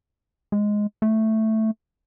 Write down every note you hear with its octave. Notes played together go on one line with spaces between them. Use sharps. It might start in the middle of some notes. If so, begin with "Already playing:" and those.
G#3
A3